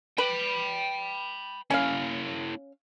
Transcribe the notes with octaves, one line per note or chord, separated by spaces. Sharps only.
B4 G5 B5
A#3 C#4 E4 F5